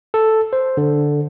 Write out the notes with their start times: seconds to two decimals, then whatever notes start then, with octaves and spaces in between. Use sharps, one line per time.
0.14 A4
0.53 C5
0.77 D3